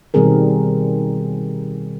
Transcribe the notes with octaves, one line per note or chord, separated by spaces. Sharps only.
B2 D#3 G3 C4 G#4 A#4